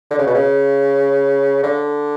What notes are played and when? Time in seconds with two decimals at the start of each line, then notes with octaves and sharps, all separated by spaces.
0.11 D3
0.19 C#3
0.27 B2
0.35 C#3
1.63 D3